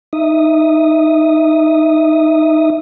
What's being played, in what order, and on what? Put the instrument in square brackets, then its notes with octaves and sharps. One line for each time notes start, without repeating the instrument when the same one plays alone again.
[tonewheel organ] D#4 E5 D#6